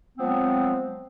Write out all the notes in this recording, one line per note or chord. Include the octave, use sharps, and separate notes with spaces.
F3 F#3 G#3 B3 C4